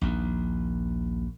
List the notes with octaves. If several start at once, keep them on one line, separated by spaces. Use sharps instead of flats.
A#1 D#2